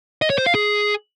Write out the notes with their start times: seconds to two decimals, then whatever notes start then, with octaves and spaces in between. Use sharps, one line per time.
0.22 D#5
0.30 C#5
0.38 C5
0.46 F5
0.55 G#4